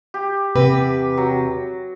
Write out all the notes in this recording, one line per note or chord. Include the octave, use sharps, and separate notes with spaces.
G4
E2 C3 B4
F#3